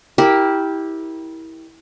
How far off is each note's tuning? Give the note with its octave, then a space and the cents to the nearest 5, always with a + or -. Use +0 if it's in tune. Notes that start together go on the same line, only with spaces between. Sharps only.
E4 -20 G4 +0 A#4 +0